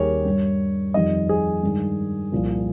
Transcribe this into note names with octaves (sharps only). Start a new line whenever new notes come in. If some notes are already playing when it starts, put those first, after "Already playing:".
Already playing: D#2 D#3 G3 G4 G#4 A#4 C#5
G2 G3
F2 D#3 G3 D#5
G#4
G2 D#3 G#3
C2 A#2 F3